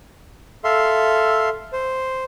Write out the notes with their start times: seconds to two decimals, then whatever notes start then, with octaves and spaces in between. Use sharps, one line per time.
0.64 A4 E5 F5 C6
1.73 C5